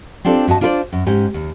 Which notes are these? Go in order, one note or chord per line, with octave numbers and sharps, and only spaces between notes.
C4 D4 F4 G4 A4 D5
G2 F#4 D#5 A5
D4 F4 F#4 B4 C5 D5
F#2
G#2 C#4 G4 G#5
D#2